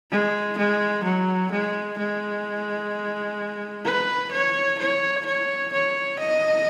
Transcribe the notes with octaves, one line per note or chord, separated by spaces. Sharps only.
G#3
G#3
F#3
G#3
G#3
B4
C#5
C#5
C#5
C#5
D#5